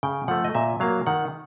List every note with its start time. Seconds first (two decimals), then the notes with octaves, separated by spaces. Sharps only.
0.03 C#3 G5
0.28 F3 A3 F#5
0.44 D#5
0.55 A#2 E5
0.80 F#3 A#3 F5
1.07 D#3 F#5